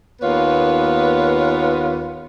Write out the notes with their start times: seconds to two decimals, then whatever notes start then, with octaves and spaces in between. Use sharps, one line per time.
0.21 D#2 A#3 B3 F4 B4 C#5